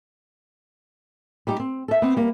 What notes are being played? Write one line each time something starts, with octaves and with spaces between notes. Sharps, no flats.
G3 D#4 G4
C4
A4 E5
B3 C4
G3 A#3